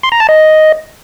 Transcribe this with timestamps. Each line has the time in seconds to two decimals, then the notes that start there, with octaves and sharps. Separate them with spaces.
0.03 C6
0.12 A#5
0.20 A5
0.29 D#5